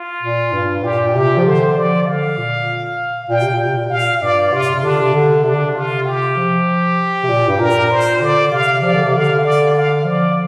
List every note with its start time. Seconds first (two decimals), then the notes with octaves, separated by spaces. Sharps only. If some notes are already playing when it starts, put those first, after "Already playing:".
Already playing: F4
0.23 A#2
0.53 G2
0.84 A#2 G4
1.15 C3 G4
1.38 F3
1.45 D3 C5
1.76 F3 D5
2.06 D3 F5
2.38 A#2
3.29 A#2 G5
3.42 C3
3.53 A#2
3.65 C3
3.77 A#2
3.90 A#2 F5
4.22 G2 D5
4.53 C3 F4
4.74 C3
4.84 D3 D4
5.02 C3
5.14 D3
5.44 C3 D4
5.54 D3
5.65 C3
5.75 F4
6.07 G4
6.36 F3
7.23 C3
7.29 A#2
7.48 G2
7.59 A#2 A#4
7.91 C5
8.21 D3 D5
8.52 C3 F5
8.82 F3 D5
8.94 D3
9.04 C3
9.13 D3 F5
9.43 D5
9.75 F5
10.05 F3 D5